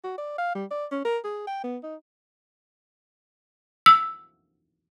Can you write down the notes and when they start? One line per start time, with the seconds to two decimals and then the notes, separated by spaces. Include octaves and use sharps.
0.04 F#4
0.18 D5
0.38 F5
0.55 G3
0.71 D5
0.91 C#4
1.05 A#4
1.24 G#4
1.47 G5
1.64 B3
1.83 D#4
3.86 E6